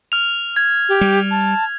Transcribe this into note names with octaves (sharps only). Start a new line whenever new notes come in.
F6 F7
G#6
G4
G3
A5